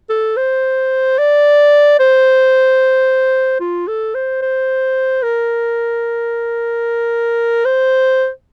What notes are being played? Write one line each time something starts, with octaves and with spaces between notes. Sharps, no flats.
A4
C5
D5
C5
F4
A4
C5
C5
A#4
C5